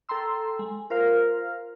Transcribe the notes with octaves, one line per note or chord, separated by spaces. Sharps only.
A4 G5 A#5 C6 E6
G#3
F4 A#4 C5 F5 F6